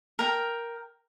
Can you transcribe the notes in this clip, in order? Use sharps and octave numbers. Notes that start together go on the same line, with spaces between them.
A#4 G5